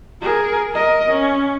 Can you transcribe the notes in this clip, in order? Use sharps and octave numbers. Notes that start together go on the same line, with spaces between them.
G#4 A#4
A#4 D#5
C#4